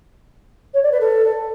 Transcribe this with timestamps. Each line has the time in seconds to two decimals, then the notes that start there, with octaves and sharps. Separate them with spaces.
0.74 C#5
0.83 D5
0.92 B4
1.01 A4